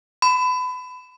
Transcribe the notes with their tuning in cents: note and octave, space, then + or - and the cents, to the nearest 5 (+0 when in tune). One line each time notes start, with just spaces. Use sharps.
B5 +30